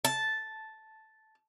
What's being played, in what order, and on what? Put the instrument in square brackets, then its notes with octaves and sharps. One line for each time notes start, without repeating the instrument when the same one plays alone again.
[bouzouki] A5